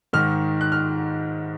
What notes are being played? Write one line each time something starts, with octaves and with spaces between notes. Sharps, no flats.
G#2 D#3 F6
F#6
F6